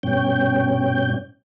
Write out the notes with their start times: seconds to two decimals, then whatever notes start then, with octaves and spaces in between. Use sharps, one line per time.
0.03 G2 B2 C#4 G5